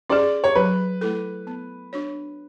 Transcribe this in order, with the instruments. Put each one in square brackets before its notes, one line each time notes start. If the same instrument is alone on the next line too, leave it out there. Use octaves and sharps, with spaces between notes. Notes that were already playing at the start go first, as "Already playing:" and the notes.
[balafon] C#4 G#4 [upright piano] D5
[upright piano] C#5
[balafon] F#3 [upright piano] B4
[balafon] A3 E4 A4
B3
D4 F#4 C#5